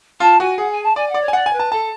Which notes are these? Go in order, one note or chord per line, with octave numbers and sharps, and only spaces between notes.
F4 A5
F#4 G#5
G#4 F#5
G#5
A5
D5 G#5
F#5
D5
C#5
G#5
D5 F#5
G#5
B4
A5
A4 A5